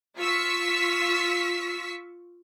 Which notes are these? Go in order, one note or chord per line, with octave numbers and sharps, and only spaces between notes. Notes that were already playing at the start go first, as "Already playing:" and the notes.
F4 C#6 E6 B6